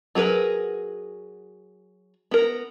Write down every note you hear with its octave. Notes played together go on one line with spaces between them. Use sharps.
F#3 G#4 A#4 B4
B3 A#4